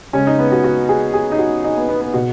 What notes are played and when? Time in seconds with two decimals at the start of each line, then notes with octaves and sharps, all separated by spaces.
0.13 C#3 G#3 C#4
0.27 D#4
0.39 B3
0.52 F#4
0.64 F#4
0.89 G#4
1.13 G#4
1.32 D#4
1.38 F#4
1.64 D#4
1.77 B3
1.89 B3
2.01 B3
2.14 B2 F#4